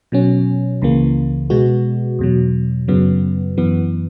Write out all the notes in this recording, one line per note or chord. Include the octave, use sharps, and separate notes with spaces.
B2 F#3 C#4
C#2 C#3 E3 A#3
B2 G#3 B3 F#4
E2 B2 F#3
F#2 C#3 F#3 B3
F#2 E3 B3